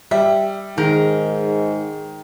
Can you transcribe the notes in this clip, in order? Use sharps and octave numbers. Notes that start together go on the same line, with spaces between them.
G3 E5
G#2 D#3 G#4 A#4